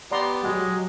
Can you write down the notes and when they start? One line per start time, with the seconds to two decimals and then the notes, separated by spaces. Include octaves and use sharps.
0.11 B3 G4 D5 A#5 C6
0.44 F#3 G#3